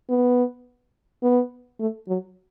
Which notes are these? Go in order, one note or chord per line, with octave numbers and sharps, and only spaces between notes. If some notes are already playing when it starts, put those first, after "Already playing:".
B3
B3
A3
F#3